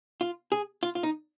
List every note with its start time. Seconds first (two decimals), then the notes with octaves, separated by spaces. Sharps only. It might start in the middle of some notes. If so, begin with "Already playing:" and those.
0.21 F4
0.52 G#4
0.83 F4
0.95 F4
1.03 D#4